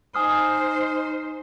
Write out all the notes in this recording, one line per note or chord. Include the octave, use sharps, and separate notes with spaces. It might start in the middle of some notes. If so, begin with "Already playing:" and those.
D#4 C5 G#5 D#6 F6